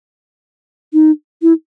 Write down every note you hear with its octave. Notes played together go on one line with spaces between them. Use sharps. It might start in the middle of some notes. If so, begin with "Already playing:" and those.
D#4
E4